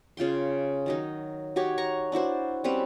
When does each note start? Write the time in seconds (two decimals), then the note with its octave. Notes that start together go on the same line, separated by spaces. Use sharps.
0.17 C#3 F4 G5 C6
0.86 D#3 F#3 D#4
1.56 D#4 F#4 G4 C#5
1.78 A#5 C#6
2.12 D4 E4 F#4 C5
2.64 G3 C4 C#4 B4